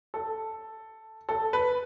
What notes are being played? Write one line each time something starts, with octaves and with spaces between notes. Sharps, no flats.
A4
A4
B4